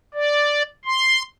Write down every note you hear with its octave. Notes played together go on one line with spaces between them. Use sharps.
D5
C6